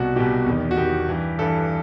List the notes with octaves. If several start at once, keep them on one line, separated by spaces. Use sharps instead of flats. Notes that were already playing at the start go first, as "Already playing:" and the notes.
Already playing: C2 B2 F#4
C2 B2 G4
E2 D#3
F#4
E2 D#3 G4
G2 E3
G2 E3 A4